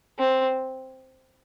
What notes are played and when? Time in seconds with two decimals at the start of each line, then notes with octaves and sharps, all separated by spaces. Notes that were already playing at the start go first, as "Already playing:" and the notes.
0.19 C4